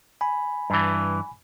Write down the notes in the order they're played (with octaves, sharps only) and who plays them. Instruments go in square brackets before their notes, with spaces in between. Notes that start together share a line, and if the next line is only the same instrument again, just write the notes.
[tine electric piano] G#5 B5
[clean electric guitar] G2 E3